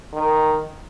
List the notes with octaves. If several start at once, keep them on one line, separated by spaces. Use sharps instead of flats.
D#3